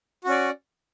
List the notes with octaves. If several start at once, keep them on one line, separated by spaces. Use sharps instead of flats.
C#4 F#4 D5